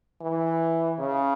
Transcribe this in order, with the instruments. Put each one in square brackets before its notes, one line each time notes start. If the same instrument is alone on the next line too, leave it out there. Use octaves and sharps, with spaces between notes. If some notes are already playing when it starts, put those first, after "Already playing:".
[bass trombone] E3
C#3